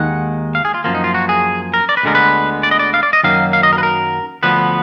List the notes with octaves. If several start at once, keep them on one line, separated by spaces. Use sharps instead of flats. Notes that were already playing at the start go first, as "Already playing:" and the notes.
Already playing: D#2 D#3 G#3 F#5
F5
G#4
F4
F#2 F3 A#3 F4
D#4
F4
F#4
G#4
A#4
D5
B4
D2 D3 G#3 B3 A#4
B4
D5
D#5
D5
F5
D5
D#5
F#2 D#3 F#3 A#3 F5
F5
D#5
A#4
B4
A#4
D2 D3 F3 B3 B4